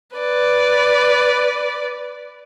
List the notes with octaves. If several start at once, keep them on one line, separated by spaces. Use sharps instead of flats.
B4 D5